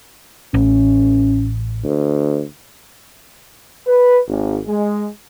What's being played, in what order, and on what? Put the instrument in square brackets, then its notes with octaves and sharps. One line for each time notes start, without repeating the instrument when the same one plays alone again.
[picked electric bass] A1 [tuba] C#4
[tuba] D2
[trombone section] B4
G#1
G#3